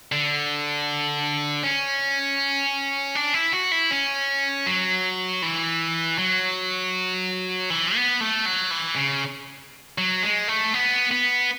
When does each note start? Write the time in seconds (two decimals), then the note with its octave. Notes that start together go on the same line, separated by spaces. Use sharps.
0.12 D3
1.63 C#4
3.15 D4
3.34 E4
3.53 F#4
3.72 E4
3.91 C#4
4.66 F#3
5.42 E3
6.18 F#3
7.70 E3
7.95 B3
8.21 A3
8.46 F#3
8.71 E3
8.96 C#3
9.98 F#3
10.23 G#3
10.48 A3
10.74 B3
11.11 B3